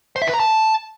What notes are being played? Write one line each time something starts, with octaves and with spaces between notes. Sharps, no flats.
C5
E5
B4
A#5
A5